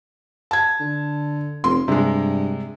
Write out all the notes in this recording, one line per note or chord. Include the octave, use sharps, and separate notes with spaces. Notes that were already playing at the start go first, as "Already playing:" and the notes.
A5 G#6
D3
F1 C6
G2 C3 G#3